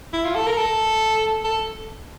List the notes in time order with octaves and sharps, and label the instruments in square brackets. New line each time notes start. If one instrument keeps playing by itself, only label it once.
[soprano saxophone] E4
F4
A4
A#4
A4
A4